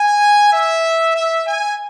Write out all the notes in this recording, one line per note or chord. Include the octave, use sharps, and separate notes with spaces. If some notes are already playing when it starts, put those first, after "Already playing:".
Already playing: G#5
E5
E5
G#5